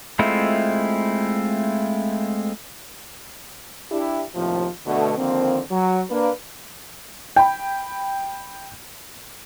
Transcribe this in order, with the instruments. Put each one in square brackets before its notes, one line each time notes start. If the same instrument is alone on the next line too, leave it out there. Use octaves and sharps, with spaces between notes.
[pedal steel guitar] G#3 A3 C4 E4 F4
[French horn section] D4 E4 G4
D#2 A2 C3 F3
B2 D3 A3
D3 D#3 F3 A#3 C4
F#3
A#3 D4 B4
[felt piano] G5 B5